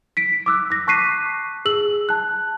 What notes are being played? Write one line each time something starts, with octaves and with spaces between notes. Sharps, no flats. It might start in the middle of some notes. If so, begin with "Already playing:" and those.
B6 D7
D6 E6 F#6
D6 A#6
A5 C#6 F#6 B6 C7 D#7
G#4 E6 F#7
A5 F#6